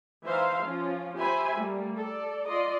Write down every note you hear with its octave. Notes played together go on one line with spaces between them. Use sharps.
E3 D#4 C5 E5 F5 C6
F3 C#4 F4
G4 C5 E5 G#5 B5
G3 A3 A#3
A4 D5
F4 D5 D#5 C6